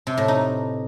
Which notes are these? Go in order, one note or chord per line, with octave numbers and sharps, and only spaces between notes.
C3
A2
D#4